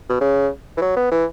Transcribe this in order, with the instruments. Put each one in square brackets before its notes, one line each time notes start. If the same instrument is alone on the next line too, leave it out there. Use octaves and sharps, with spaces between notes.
[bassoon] B2
C#3
E3
F#3
B3
E3